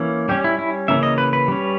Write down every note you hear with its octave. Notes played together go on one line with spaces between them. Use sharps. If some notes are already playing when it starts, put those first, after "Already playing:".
Already playing: E3 A#3 C#4
G3 C#4 G4
E4
E4
C#3 E3 A#3 C#4 E5
D#5
B4
B4
G3 C#4